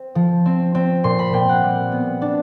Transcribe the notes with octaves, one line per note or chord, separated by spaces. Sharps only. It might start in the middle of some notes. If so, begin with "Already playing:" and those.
Already playing: C4
F3
C4
C4
A#2 C6
B5
A#2 G5
F#5
G3
B3
D4